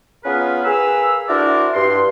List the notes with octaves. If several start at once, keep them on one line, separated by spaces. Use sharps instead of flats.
B3 C#4 F4 G#4 A#4 B4
G#4 A#4 B4 F5 E6
D4 E4 F#4 A#4 C5 D5
G2 C6